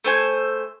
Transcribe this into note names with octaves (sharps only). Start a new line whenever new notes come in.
A3 C5 G#5